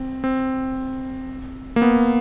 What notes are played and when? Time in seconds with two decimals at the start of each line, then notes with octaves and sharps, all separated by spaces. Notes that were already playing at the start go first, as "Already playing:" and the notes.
Already playing: C4
0.24 C4
1.76 A#3
1.82 B3